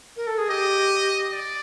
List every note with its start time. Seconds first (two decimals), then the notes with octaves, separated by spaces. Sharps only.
0.16 A#4
0.27 A4
0.38 G#4
0.49 G4 D#5
1.32 D5